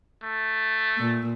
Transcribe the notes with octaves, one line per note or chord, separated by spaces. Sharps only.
A3
A#2